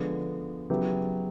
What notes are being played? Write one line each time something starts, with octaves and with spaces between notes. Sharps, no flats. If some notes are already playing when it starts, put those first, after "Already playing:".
Already playing: D3 F3 G#3 B3
C#3 F#3 B3 E4 G4